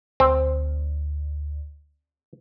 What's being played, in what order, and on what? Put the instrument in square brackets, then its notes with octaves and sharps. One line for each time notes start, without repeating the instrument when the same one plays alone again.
[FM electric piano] D2 [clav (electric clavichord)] C4